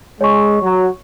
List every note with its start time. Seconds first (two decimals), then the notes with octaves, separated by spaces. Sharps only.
0.21 G#3 C#5 C#6
0.62 F#3